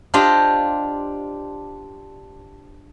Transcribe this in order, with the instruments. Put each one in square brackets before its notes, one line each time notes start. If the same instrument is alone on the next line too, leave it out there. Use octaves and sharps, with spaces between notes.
[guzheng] D4 F4 G4 C5 D#5